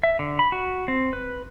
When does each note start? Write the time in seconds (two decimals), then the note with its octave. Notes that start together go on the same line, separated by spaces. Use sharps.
0.03 E5
0.19 D3
0.39 B5
0.52 F#4
0.88 C4
1.13 B4